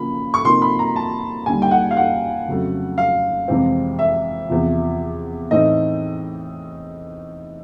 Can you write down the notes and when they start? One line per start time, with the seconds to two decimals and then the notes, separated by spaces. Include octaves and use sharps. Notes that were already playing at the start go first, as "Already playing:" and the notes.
Already playing: C#3 F3 A#3 B5
0.34 C#6
0.45 C3 F3 A#3 D#4 C6
0.62 B5
0.79 A#5
0.96 A5
1.46 D#2 D3 G3 G#5
1.62 G5
1.71 F#5
1.91 F5
1.97 F#5
2.48 F2 C#3 F#3 A3
2.98 F5
3.48 F2 C3 E3 G#3 C4
3.99 E5
4.49 E2 C3 F3
5.51 A2 E3 A3 C4 D#4 D#5